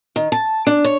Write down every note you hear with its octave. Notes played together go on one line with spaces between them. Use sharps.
D#3
A5
D4
C#5